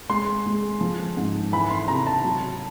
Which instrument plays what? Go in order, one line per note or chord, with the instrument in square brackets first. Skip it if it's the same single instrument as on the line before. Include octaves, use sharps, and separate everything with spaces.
[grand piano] G#3 C6
G#3
F3
G#2
E3 B5
C6
C3 A#5
A5
F#3